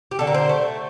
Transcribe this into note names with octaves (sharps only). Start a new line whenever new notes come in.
G4
D3 A4
A#4
C5
A3